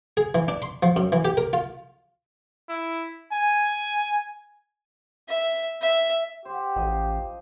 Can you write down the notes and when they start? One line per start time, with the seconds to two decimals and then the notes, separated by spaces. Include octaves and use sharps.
0.17 G#4
0.35 E3
0.48 D4
0.62 C6
0.83 F3
0.96 F#2
1.12 E3
1.25 G4
1.37 A#4
1.53 F4
2.69 E4
3.33 G#5
5.28 E5
5.81 E5
6.45 G4 C5 F#5
6.76 A1 F3 C5 D#5